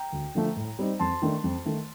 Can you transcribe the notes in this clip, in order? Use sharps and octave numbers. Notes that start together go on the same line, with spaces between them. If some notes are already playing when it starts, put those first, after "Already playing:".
Already playing: G5 A#5
D2
D3 F3 A3
A2
G3 C4 D#4
F2 A5 C6
D#3 A3 D4
F2
D#3 A3